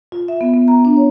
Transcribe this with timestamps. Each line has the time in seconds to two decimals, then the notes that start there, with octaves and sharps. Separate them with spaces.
0.12 F4
0.28 E5
0.41 B3
0.54 B3
0.68 A#5
0.85 D4
0.97 C#5